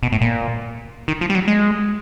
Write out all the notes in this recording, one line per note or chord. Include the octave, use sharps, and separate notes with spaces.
B2
A2
A#2
D#3
F3
G3
F#3
G#3